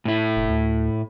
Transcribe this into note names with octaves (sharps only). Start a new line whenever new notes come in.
A2 E4
F1
D2